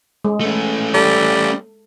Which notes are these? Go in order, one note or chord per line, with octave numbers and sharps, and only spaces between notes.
G#3
A3 C#4
G3 A4